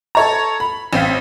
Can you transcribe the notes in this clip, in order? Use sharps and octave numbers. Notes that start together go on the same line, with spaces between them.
A4 C#5 A#5
B5
A1 C4 F5 B6